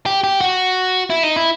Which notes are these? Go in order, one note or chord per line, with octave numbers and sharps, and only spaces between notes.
G4
G4
F#4
E4
D#4
E4